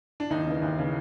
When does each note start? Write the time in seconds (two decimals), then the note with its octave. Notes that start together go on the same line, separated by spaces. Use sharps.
0.20 D4
0.30 D#2 D#4
0.46 C#3 E3
0.62 D#2
0.78 C#3 E3